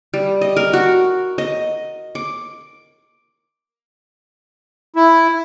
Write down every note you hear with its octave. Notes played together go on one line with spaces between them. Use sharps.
G3
D#5
A#4
F#4
D#5
D6
E4